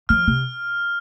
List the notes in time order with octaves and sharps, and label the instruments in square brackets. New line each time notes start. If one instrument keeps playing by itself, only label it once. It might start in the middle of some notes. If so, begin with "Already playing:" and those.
[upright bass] F3 [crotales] F6
[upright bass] C3